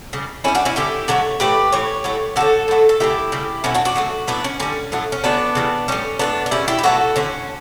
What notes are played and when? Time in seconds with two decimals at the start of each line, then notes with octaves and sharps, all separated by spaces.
0.13 C#3 G3
0.44 D3 C#4 E4
0.48 G3
0.55 D4 F#4
0.65 C#4 E4
0.76 D3 G3 E4 G4
1.08 D3 F#3 A3 A4 C#5
1.40 A2 E3 A3 G4 B4
1.72 A2 E3 C#5
2.04 A2 F#3 A3
2.36 D3 G3 F#4 A4
2.68 A2 F#3 A3
2.89 A4
3.00 C#3 E3 A3 E4 G4
3.32 C#3 G3
3.64 B2 F#3 A3 C#4 E4
3.75 D4 F#4
3.85 D4 F#4
3.96 C#3 F#3 A3
4.27 A2 F#3 A3 B3 D4
4.44 C#4
4.60 D3 G3 C#4
4.92 A2 F#3 A3
5.12 C#4
5.24 C#3 F#3 A3 B3 D4
5.55 C#3 E3 G3
5.88 A2 G3 C#4
6.19 A2 F#3 A3 B3 D4
6.46 D4
6.51 C#3 G3 C#4 E4
6.68 E4 G4
6.79 G4
6.83 B2 F#3 A3 F#4 A4
7.16 D3 F#3 A3 C#4